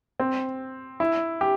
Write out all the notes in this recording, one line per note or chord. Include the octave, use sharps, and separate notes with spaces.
C4
E4
G4